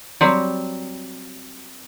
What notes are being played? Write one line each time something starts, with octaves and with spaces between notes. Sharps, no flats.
F#3 G3 C4